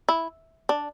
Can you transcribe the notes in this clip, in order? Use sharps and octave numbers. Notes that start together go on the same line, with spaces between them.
E4
D4